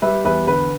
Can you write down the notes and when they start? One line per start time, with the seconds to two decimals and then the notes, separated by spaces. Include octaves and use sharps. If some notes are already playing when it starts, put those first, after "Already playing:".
0.02 G3 B4 E5
0.24 E2 B4 E5
0.47 D3 B4